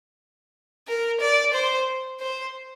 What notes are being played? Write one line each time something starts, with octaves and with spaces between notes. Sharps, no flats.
A#4
D5
C5
C5